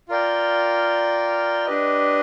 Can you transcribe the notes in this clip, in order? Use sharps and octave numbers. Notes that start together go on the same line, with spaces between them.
F4 A#4 D5 G5
D4 G4 B4 D#5